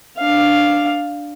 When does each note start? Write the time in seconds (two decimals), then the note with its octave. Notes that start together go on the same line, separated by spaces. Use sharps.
0.18 D4 F5